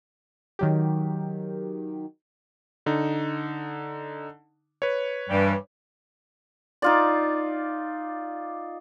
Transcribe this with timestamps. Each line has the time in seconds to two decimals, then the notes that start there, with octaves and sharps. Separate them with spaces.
0.59 D#3 F#3 G4
2.86 D3 D#4
4.82 B4 C#5
5.29 G2 E3 G3
6.82 D#4 F4 D5